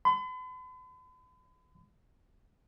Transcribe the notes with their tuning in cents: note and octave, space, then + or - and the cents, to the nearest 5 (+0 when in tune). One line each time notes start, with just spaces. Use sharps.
B5 +45